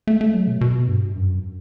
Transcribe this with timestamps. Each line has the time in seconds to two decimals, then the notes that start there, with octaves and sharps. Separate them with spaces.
0.07 A3
0.21 A3
0.34 F#3
0.47 B2
0.61 B2
0.88 G2
1.15 F#2